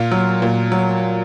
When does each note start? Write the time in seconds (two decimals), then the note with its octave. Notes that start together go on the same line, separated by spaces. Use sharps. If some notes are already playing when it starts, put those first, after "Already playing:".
Already playing: A#2 F4
0.11 F#3
0.42 A#2
0.72 F#3